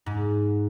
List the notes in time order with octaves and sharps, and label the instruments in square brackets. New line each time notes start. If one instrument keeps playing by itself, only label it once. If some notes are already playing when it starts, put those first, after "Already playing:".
[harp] G#2